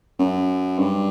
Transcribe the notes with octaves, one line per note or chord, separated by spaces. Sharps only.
F#2
G2